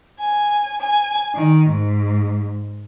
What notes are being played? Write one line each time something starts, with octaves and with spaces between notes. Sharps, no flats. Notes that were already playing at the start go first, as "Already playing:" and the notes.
G#5
G#5
D#3
G#2